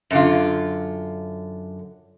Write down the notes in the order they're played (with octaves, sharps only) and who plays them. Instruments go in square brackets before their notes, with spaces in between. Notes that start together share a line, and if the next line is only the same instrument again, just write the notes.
[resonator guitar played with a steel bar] F#2 D3 F4